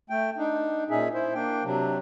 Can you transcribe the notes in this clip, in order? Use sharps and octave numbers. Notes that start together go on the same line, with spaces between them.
A3 G5
D4 D#4
A#2 C#4 D#4 G#4 E5
E4 C5
A#3 D4 G5
C3 F#3 D4